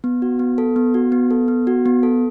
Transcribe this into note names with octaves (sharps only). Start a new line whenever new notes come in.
B3
F#4
B3
A4
B3
F#4
B3
A4
B3
F#4
B3
A4